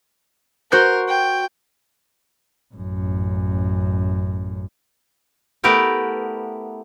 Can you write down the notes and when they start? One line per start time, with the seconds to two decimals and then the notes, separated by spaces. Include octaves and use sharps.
0.72 F#4 A#4 C5 G6
1.09 G5
2.74 A1 F#2
5.64 A3 B3 E4 G4 A#4 G5